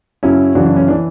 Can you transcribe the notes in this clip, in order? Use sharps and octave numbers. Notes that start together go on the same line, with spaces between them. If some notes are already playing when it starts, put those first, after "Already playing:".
F#2 C#3 F#3 C#4 E4
F#2 C#3 E3 D4 F#4
D4
C#4
E3 D4